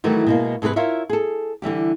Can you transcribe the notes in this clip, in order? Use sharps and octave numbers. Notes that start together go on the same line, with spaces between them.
D#3 E3 F#3 G3 A3
B2 G#3 A#3
G2 C3 G#4 A4 B4
E4 F4 A#4 C#5 E5
G#4 A4
D3 E3 G3 G4